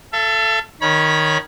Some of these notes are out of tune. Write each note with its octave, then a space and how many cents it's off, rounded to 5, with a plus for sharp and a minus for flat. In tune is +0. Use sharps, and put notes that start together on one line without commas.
A4 +0 E5 +45
D#3 -5 C#5 +0 B5 -30